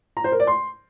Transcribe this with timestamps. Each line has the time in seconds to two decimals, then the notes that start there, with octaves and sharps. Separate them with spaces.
0.17 A#5
0.24 C5
0.32 A#4
0.40 D5
0.47 C6